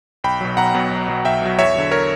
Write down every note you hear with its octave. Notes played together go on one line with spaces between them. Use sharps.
B1 G5 B5
B2 F#3
B1 F#5 A#5
B2 F#3
B1
B2 F#3
B1 E5 G5
B2 F#3
E2 C#5 E5
D3 F#3
A#4 C#5